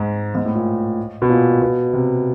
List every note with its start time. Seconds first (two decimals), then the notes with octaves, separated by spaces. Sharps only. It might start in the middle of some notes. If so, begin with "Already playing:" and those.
Already playing: G#2
0.35 G#2
0.45 A2
0.55 A#2
1.22 B2
1.29 A#2
1.62 B2
1.93 C3